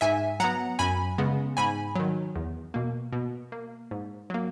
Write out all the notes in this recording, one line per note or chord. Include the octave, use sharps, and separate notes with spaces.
G#2 E5 G#5
F#3 B3 F#5 A#5
F#2 G#5 B5
C#3 G#3 B3
G#2 G#5 B5
D#3 F#3
E2
B2 A#3
B2
A#3
G#2
F#3 A#3